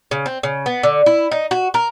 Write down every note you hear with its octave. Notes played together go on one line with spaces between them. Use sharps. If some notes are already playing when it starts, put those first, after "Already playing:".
C#3
C4
C#3
B3
D3
E4
D#4
F#4
A#4